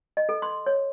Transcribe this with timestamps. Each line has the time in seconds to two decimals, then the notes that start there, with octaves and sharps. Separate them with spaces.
0.17 D#5
0.29 A4
0.42 C6
0.66 C#5